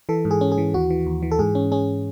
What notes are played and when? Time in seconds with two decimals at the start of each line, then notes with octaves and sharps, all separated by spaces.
0.09 E3 A4
0.25 G#2
0.31 G#4
0.41 C#4
0.52 G#4
0.58 E3
0.74 D#2 F#4
0.90 E3
1.06 D#2
1.22 E3
1.31 A4
1.39 G#2 G#4
1.55 C#4
1.72 C#4 G#4